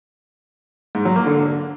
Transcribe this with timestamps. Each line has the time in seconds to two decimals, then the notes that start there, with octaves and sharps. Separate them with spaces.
0.95 G#2
1.05 F#3
1.16 A#3
1.26 D3